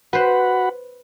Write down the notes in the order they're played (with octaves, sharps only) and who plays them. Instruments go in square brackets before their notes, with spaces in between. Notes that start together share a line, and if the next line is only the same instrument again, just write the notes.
[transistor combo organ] F#4 F#5 B5 [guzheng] B4 C5